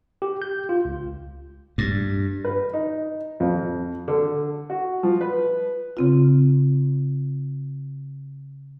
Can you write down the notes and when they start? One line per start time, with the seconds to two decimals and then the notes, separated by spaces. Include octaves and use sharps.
0.22 G4
0.42 G6
0.69 F4
0.85 C#2
1.78 G2
2.45 B4
2.74 D#4
3.40 F2
4.08 D3
4.70 F#4
5.03 F3
5.21 B4
5.97 C#3 C4 F4